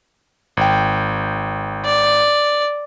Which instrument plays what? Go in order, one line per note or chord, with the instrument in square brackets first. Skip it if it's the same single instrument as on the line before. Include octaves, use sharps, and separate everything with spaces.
[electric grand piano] G#1 G5
[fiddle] D5